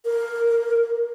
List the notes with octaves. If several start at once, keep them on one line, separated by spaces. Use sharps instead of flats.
A#4